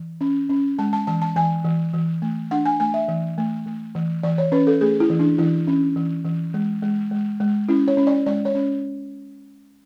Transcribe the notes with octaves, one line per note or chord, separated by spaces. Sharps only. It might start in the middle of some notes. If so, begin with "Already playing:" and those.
Already playing: E3
C#4
C#4
G#3 A5
A5
E3 A5
A5
E3 G#5
E3
E3
A3
D4 F#5
G#5
A3 G#5
E5
E3
A3
A3
E3
E3 D5
C#5
C#4 B4
A4
A3 G#4
E4
E3
D4
E3 E4
C#4
E3
E3
G#3
G#3
G#3
G#3
C#4 E4
C#5
C#4
D5
G#3 D5
C#5
C#4